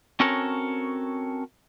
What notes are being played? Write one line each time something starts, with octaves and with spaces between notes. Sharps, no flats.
C4 C#4 F#4 A4 A#4 C#5